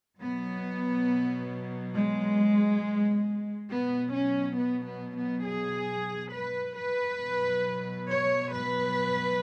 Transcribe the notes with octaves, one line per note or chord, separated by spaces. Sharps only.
B2 F#3 B3
G#3
B2 F#3 B3
C#4
B3
B3
B3
G#4
B4
B4
B2 F#3
C#5
B4